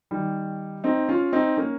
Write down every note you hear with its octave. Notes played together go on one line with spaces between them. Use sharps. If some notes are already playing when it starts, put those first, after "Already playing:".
D#3 G3
C4 D#4
C#4 F4
C4 D#4
A#3 C#4